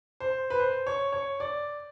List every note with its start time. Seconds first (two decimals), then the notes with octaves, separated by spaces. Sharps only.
0.20 C5
0.50 B4
0.60 C5
0.87 C#5
1.12 C#5
1.40 D5